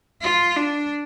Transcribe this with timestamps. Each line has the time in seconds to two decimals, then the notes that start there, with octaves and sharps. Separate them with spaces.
0.22 F4
0.57 D4